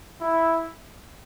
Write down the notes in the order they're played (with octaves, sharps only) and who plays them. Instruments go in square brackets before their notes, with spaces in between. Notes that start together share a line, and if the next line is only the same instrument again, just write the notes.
[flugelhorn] E4